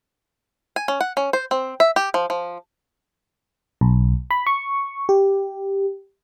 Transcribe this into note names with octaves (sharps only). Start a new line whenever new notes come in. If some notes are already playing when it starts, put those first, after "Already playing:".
G#5
C#4
F#5
C#4
C5
C4
E5
G4
F3
F3
B1
B5
C#6
G4